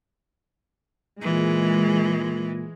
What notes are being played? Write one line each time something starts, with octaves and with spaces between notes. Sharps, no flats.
A#2 E3 G#3